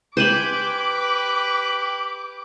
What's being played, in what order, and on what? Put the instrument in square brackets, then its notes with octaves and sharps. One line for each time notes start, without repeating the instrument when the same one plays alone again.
[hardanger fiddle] G4 B4 [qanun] C5 G#5 B5 [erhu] D6